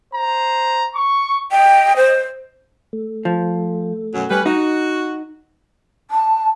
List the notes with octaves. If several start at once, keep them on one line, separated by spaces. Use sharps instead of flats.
C5 A#5
C#6
D#5 G5
C5
A3
F3
F#2 B2 F#3
G3 C#4 B4
D#4 F#4
A5